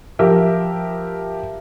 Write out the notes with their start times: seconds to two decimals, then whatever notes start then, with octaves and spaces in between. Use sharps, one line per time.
0.19 F3 G4 A#4 E5